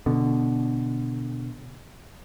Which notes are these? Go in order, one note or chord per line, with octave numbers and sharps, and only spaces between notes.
B2 D3